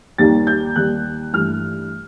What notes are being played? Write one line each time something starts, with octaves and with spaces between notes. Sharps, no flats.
D#2 D#3 G3 A#3 A6
G6
D#2 D#3 G3 A#3 F#6
G2 E3 A3 F6